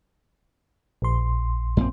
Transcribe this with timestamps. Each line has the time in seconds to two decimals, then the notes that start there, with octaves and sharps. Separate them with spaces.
1.02 A#1 C6
1.77 F#2 A#2 C4